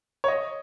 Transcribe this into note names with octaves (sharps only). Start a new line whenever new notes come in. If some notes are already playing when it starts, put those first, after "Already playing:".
C#5
D#5